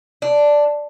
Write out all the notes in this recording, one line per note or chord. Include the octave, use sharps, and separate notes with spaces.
D4